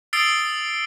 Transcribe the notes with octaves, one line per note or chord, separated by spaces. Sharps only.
D#6 E6 A6 C7 D7 G7